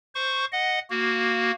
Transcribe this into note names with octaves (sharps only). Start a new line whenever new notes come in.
C5 C#6
D#5 F#5
A#3 F#4